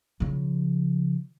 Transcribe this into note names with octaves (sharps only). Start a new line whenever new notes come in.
C#3 F3